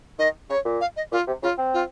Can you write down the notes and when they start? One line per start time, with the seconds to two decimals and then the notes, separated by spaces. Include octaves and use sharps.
0.19 D#3 D#5
0.50 C#3 C#5
0.65 A#2
0.81 F5
0.97 D#5
1.12 A#2 F4
1.27 C3
1.43 C#3 F4
1.58 C4
1.74 F4